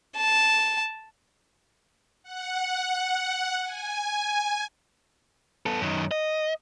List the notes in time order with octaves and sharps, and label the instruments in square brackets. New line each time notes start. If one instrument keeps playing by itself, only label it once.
[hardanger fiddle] A5
[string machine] F#5
G#5
[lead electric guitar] B3 A4
F#2 D#3
D#5